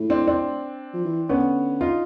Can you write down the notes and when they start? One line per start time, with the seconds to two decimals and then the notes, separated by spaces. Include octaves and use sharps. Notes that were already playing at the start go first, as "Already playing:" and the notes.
Already playing: A2
0.10 C4 D4
0.27 C4 D4
0.94 F3
1.05 E3
1.29 D3 B3 C#4
1.81 D#4 F4